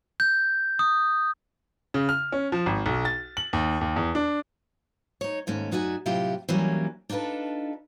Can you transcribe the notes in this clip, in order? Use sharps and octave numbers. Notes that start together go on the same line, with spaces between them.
G6
D#6
C#3
F6
C#4
F3
G#1
B1
A6
F#7
D#2
D#2
E2
D4
D#4 C#5
D#2 G#2 A3 C#4
F#2 D#4 F#4 D5 E5 G#5
A2 C3 F#3 E4 F4 G4
E3 F#3 G3 A#3 C#4 D4
D4 D#4 F4 A4 B4